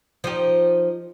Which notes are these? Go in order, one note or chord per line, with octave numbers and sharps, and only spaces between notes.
F3 D#4 G4